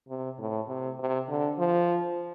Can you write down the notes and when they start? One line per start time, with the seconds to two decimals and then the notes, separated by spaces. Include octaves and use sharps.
0.08 C3
0.39 A2
0.68 C3
0.99 C3
1.29 D3
1.58 F3